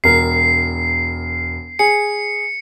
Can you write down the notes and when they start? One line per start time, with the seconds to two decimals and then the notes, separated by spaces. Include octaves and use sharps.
0.04 E1 A#4 C7
1.79 G#4 C#7